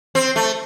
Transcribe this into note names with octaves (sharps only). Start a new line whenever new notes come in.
C4
A3